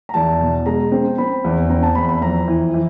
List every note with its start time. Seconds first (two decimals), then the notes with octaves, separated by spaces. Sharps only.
0.09 A#5
0.14 E2 A5
0.41 B2
0.66 G#3 A#5
0.92 C4
1.18 C4 B5
1.44 E2
1.70 C4 A#5
1.83 A5
1.95 E2 B5
2.09 B5
2.22 F2 A#5
2.48 E3
2.74 E3